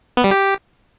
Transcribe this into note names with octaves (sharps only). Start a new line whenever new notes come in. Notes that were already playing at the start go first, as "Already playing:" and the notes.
B3
G3
G4